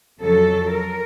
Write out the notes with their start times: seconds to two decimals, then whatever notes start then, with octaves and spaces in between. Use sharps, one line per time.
0.20 F2 C#3 F#3 A4
0.73 A#4